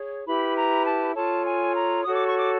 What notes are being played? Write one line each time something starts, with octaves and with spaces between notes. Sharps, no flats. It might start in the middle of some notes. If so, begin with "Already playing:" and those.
Already playing: G#4 C#5
E4 G4 B4 B5
A#5
A5
F4 A4 C#5 A5
G#5
A#5
F#4 A4 C#5 D#6
D6
C#6
D6